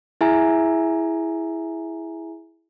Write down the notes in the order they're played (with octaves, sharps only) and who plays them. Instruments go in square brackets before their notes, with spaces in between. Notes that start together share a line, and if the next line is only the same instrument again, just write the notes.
[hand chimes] E4 G#4 E5 G#5 A#5